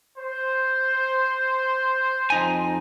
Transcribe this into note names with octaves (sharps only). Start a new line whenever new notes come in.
C5
F2 D#4 G#5